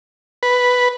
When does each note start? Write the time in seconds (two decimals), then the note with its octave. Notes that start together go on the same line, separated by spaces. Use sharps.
0.43 B4